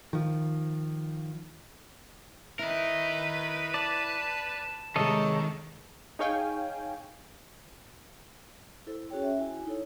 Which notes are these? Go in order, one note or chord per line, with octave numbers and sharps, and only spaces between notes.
D#3 F3
E4 A#4 B4 D#5
D5 A5
C3 D#3 G#3 A4 C#5 D#5 A5
D#4 G#4 C#5 F5 G5 G#5
E4 A4 C5
C#4 F#4 G#4 C#5 G5
E5
E4 F#4 G#5
D#4 E4 A4 C#5